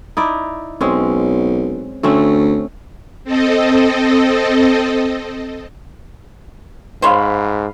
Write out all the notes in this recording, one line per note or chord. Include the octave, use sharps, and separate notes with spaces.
D#4 E4 D5
B1 G#3 C4 C#4
D2 A3 C4 C#4
C4 A4 D#5
G#2 C5 C#5 F5 B5 D#6